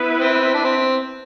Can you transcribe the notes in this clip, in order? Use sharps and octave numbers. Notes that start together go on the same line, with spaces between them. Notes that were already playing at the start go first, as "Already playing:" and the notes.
Already playing: B3 E4 B4
C4
D4
C4